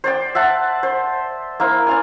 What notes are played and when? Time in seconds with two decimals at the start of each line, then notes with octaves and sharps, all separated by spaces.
0.04 C5 D5 G5
0.35 E5 F#5 A5
0.83 C5
1.60 A#3 E4 C5
1.87 D5 F5 G#5